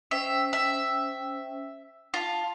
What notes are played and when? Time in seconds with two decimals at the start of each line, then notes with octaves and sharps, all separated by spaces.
0.11 C#4 C5 E5 G5
0.53 E5
2.14 F4 F5 A5